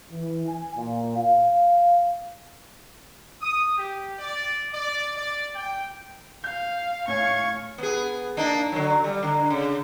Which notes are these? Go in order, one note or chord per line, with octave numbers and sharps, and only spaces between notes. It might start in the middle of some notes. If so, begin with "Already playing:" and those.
E3
G#5
A#2
F5
D#6
G4
D5
D5
D5
G5
F5 G6
A2 C#5 F5 G#5 C#6 G#6
B3 G#4
A#3 D4 D#4
D3 F#3
G3
D3
C#3